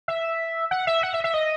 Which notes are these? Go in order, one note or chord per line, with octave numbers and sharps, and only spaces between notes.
E5
F#5
E5
F#5
E5
E5
D#5